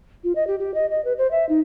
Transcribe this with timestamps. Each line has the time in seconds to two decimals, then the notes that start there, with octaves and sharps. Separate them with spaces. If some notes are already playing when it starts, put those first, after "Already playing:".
0.24 F4
0.36 D#5
0.47 G4
0.59 G4
0.74 D#5
0.90 D#5
1.05 B4
1.18 C5
1.31 E5
1.49 D#4